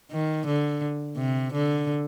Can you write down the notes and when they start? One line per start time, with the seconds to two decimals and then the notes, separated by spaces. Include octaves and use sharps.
0.11 D#3
0.46 D3
1.17 C3
1.53 D3